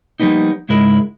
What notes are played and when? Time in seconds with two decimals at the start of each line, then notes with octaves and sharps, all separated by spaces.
0.20 F3 G3 A#3 B3 D#4
0.69 C#2 G#2 G#3 E4 A#4